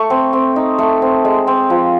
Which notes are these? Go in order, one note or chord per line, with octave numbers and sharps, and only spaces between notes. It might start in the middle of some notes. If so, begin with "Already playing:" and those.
Already playing: A3 C#6
C4
C4
D#4
A3
C4
G#3
C4
F3